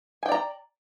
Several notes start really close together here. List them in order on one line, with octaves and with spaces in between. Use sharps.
G#5 G5 D5 A#5